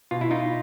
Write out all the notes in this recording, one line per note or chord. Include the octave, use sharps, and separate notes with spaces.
B2 F4
E4
D#4 F4